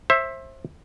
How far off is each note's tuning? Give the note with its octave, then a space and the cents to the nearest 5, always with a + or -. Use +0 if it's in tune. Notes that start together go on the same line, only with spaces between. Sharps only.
C5 +30 E5 +0